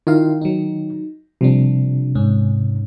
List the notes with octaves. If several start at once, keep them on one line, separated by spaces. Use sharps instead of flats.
D#3 E4 F4 F5
F#3 D#4
C3 F3 G3 D4
G#2 C#4